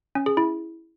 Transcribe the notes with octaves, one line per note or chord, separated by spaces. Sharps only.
C#4
G#4
E4